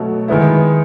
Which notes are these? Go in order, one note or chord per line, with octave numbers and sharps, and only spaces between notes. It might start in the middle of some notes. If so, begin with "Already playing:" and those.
Already playing: B2 F#3 A3
D#3 G#3 B3 E4